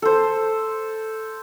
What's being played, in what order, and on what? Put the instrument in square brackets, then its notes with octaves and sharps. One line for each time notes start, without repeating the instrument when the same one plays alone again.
[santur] A4 C5